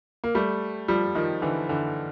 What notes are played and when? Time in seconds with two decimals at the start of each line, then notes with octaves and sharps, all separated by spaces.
0.24 A#3
0.35 G3 A3
0.88 F3 G3
1.15 D#3 F3
1.42 D3 E3
1.69 D3 E3